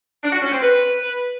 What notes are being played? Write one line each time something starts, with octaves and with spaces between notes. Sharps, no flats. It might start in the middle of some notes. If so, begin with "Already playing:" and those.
D4
F#4
C#4
C4
B4